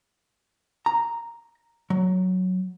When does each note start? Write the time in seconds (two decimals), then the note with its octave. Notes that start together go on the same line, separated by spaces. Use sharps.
0.86 A#5
1.90 F#3